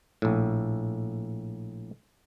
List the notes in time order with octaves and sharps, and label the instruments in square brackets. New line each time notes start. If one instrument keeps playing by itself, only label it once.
[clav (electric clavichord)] A#1 A2